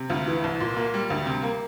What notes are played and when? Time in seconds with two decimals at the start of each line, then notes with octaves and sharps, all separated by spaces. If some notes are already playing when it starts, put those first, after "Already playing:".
Already playing: C3
0.10 D2 F4
0.27 E3
0.44 C2
0.60 A#2
0.76 A#3 F4
0.94 G3
1.10 D2
1.26 C3
1.42 A#3